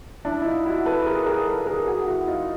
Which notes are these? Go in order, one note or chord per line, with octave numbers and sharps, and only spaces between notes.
D4 E4
E4
D#4 F4
E4 F#4
A4 B4
G#4 A#4
G#4 A#4
A4 B4
G#4 A#4
F#4 G#4
E4 F#4
D#4 F4